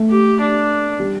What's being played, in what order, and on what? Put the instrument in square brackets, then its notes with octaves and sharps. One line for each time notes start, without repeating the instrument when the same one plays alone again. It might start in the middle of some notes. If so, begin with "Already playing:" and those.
Already playing: [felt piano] A3
[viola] G4
D4
[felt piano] G3